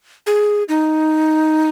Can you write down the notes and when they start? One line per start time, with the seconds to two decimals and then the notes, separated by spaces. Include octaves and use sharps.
0.27 G#4
0.69 D#4